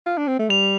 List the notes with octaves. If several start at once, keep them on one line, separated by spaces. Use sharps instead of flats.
F4
D4
C4
A3
G3 F7